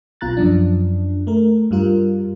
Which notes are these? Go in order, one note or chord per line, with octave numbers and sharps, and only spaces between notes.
B1 B2 F4 A#5 F#6 A6
F#2 F3 D4
A3 A#4
G2 G3 F4 A#4